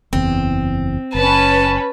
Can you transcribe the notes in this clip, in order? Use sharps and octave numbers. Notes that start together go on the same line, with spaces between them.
F#1 E2 C4
F#1 C#4 B4 A5